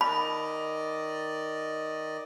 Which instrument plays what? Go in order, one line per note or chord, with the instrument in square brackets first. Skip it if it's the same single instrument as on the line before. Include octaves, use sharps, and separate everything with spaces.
[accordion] D#3 D5 D#5 [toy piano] B5